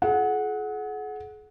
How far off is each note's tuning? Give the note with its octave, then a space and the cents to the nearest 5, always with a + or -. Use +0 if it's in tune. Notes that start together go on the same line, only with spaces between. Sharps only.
F4 +0 G#4 +40 F#5 -5